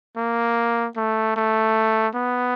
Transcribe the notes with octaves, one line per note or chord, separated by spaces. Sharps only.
A#3
A3
A3
B3